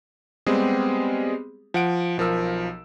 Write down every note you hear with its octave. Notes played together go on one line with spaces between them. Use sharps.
G3 G#3 B3 C4 G4 G#4
F3 F#5 D7
B1 F3 A#4 E6